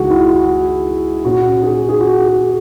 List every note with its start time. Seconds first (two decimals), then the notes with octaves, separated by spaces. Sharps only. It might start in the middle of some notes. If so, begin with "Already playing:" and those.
Already playing: C#2 C#3 E3 G#3 D#4 F#4 G#4
0.10 E4
0.30 F#4
1.24 A#2 A#3 C#4 F#4
1.63 G#4
1.89 G#4
2.01 F#4
2.25 G#4